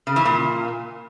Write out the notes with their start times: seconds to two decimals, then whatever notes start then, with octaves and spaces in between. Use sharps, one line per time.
0.07 C#3
0.16 E3
0.25 A#2